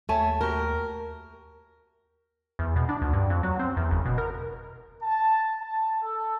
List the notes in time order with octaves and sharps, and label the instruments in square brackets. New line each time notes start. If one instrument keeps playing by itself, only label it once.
[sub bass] D#2 [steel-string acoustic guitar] A3 [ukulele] C#5 G#5 A5
[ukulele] F#4 G4 [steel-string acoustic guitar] A#4
[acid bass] E2
B2
D4
D2
G2
F2
F#3
C4
E2
F#1
B2
A#4
[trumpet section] A5
A5
A4